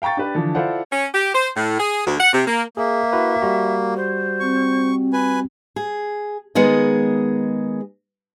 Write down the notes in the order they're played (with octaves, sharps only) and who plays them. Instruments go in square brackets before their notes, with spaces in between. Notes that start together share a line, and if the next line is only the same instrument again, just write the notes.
[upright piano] F5 G5 A#5 C#6 A6
D4 G4 B4
D3 E3 F3
E4 F4 A4 C5 D5 F#5
[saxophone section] C#4
G4
C5
A2
G#4
D2
F#5
C3
A#3
[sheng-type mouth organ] A#3 [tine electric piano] G#4 [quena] E5
[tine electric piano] E4 F#4 B4
G3 F#4
[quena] C5
[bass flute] C4 [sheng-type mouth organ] C#6
[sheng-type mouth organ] B4 G#5
[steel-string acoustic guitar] G#4
D#3 G#3 B3 G#4 D#5